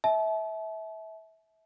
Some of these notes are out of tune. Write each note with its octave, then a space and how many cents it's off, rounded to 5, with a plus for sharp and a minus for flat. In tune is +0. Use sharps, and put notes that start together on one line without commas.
E5 -25 A5 -40